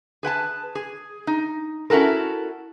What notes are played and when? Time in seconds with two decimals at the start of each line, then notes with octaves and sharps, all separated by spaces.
0.23 G#4 B4 G5 A5
0.75 G#4
1.27 D#4
1.90 C#4 E4 F#4 A4 A#4